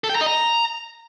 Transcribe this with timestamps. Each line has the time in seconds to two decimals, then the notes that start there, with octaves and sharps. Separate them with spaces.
0.04 A4
0.10 G5
0.15 A#5
0.21 D#5
0.27 A#5